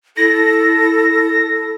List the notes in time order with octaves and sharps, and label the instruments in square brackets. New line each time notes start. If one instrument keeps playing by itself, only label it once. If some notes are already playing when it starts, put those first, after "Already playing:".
[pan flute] E4 [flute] A4 [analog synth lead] A#6